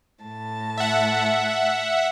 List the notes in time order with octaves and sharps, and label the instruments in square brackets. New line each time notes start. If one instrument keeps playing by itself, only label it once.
[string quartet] A2 A5
[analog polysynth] E5 F#5